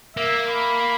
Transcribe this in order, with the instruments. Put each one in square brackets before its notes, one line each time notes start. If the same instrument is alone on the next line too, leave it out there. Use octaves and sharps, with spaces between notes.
[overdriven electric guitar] A#3 [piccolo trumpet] E5
[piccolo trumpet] B5